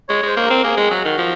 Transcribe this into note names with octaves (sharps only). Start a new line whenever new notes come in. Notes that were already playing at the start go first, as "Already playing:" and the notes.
G#3 C#5
G#3 C5
A#3
A#4
C4
A#3 G#4
G#3
F#3 F#4
D#3
F3